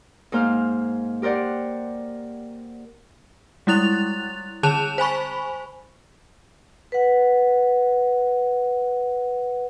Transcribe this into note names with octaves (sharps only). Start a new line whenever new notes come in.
G#2 A#3 C5 F5 F6
G4 A#4 C5 D5 F#5
G3 G#3 E4 F#6 A6 F7
D3 G#4 A5 F#6 E7 F7
C5 G#5 B5 C#6
B4 F#5